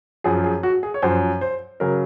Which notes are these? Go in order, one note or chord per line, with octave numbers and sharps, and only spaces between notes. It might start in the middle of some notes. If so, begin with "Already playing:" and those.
F#2 F3 G#4
G#4
F#4
G#4
C#5
F#2 F3 C5
C5
C#3 F#3 A#4